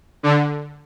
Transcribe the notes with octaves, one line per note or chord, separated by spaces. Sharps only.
D3